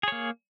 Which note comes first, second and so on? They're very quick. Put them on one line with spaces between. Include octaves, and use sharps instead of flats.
G#4 C#5 A#3